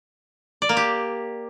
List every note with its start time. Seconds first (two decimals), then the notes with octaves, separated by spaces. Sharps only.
0.62 D5
0.69 A#3
0.77 G4